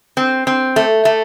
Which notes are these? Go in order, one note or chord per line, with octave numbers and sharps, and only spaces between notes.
C4
C4
A3
A3